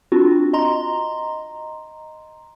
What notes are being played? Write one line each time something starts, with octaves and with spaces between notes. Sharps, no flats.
C4 D4 F4 F#4
D#5 A#5 C6